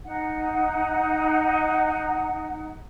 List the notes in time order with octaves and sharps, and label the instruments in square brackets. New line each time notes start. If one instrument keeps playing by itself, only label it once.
[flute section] D#4 F#5